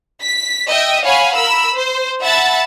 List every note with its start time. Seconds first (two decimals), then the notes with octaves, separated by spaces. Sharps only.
0.22 B6
0.68 D#5 E5 G5
1.05 C#5 F5 F#5 G#5 B5
1.35 A#4 B5 E6
1.75 C5
2.23 E5 F#5 A5 B5 A6